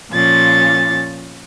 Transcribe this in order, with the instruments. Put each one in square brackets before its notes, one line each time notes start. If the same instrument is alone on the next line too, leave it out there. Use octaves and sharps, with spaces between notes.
[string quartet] A#2 F3 C#4 A6